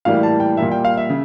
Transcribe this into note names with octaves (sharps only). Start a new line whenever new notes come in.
A2 E3 G3 A#3 F5
A5
G5
A#2 G3 A#3 E5
G5
F5
E5
C#3